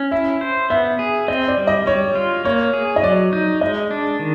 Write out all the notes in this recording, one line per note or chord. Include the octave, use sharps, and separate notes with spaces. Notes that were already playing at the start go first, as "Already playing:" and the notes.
Already playing: C#4
E4 E5
C5
B3 E5
G#4
C4 D#5
D5
G3
D#5
G3 C#5
F4
A#3 C#5
G#4
D#5
F#3 D5
D#4
G#3 D#5
D4
D#3